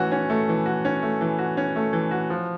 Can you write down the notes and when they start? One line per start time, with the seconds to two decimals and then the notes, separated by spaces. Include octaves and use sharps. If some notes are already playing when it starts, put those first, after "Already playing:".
Already playing: E3 A3 C#4 F#4
0.12 C#4
0.30 A3
0.49 E3
0.66 F#4
0.85 C#4
1.03 A3
1.21 E3
1.39 F#4
1.57 C#4
1.76 A3
1.93 E3
2.11 F#4
2.30 F3